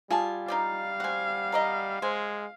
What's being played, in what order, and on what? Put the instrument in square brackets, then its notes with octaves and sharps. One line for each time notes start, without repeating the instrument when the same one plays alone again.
[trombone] G3 [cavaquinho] F4 G#5 A5 [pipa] G#4
[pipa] D#4 G4 D5 [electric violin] F5
[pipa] C4 F#4 [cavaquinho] F#5 G#5
[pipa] A#4 D5 D#5
[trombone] G#3 [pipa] C5 [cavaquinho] G#5